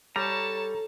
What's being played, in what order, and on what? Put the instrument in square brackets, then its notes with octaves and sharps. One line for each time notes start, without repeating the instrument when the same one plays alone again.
[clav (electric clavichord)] G3 [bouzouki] A4 [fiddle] C#5 A5 [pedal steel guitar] A#5